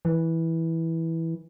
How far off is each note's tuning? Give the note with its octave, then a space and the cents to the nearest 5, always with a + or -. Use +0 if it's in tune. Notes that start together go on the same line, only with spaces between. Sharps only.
E3 -10